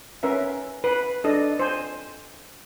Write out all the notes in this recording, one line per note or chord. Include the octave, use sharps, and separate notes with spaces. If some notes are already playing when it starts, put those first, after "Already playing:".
C#4 A#4 B4 E5
B4
D4 A4 D#5
C5 G#5